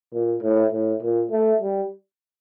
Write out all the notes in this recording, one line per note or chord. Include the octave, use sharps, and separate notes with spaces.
A#2
A2
A2
A#2
A3
G3